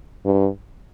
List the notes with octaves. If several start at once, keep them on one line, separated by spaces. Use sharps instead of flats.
G2